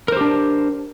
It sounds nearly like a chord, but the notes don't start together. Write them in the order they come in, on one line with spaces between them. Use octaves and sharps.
A#4 C5 G4 D4